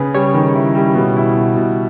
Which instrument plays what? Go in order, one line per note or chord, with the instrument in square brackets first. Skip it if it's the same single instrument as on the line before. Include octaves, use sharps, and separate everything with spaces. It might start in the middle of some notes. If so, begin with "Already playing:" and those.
Already playing: [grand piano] C#3 [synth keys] G#4 B4
[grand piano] G3 [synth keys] C#5
[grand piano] D#3
E4
G3
B2
E4
B2
B2